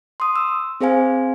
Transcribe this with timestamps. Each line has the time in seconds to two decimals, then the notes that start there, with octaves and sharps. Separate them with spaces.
0.20 C6 D#6
0.36 E6
0.81 C4 G#4 C5 F5 G#5